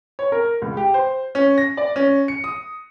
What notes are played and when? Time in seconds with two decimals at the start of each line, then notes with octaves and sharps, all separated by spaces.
0.19 C#5
0.32 A#4
0.62 C#2
0.77 G4
0.94 C5
1.35 C#4
1.58 A#6
1.77 D5
1.96 C#4
2.28 C#7
2.44 D#6